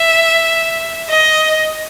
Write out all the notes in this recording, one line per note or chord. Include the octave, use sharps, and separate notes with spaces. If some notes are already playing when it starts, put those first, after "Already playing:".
Already playing: E5
D#5